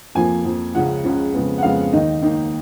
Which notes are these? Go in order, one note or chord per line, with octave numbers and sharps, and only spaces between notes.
F2 F3 A#3 G#5
F2 F3 A#3
C#2 C#3 F3 F#5
C#2 C#3 F3
F2 C#3 G#3 B3
F#5
F2 C#3 G#3 B3 F5
D#2 D#3 A#3 D#4 D#5
D#2 D#3 A#3 D#4